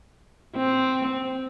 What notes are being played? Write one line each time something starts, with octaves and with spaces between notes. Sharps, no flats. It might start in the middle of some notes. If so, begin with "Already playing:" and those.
C4